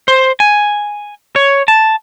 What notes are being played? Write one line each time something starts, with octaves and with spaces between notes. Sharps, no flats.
C5
G#5
C#5
A5